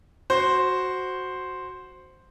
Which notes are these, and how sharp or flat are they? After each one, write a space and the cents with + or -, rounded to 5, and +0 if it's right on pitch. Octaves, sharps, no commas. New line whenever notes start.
F#4 +0 C5 +0